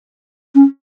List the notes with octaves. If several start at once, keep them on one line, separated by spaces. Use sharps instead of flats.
C#4